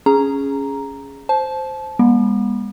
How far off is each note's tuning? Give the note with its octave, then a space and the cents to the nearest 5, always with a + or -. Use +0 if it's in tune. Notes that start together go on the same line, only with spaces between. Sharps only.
C#4 +0 G#4 +0 A#5 +0
C5 +0 A5 -25
G#3 -45 B3 -40